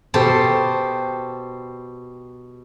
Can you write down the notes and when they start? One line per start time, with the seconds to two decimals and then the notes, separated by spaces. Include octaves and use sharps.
0.14 B2 G4 A4 C5